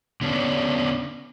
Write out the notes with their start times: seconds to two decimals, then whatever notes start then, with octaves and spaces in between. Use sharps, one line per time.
0.21 D3 B3 C#4 D4